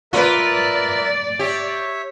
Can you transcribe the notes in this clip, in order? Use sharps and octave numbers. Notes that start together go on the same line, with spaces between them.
F4 A#4 B4 D5 E5 F#6
G4 C#5 E5